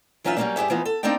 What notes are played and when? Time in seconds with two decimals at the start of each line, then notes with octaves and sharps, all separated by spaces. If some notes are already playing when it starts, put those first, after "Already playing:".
0.24 E3 F#3 C#4 D#4 F4 E5
0.37 F#3 G3 A3 A#3 C#4 D4
0.56 G2 G4 G#4 E5
0.70 E3 F3 A#3 B3 D#4
0.85 A4
1.03 A#3 C4 D4 D#4 D5 G5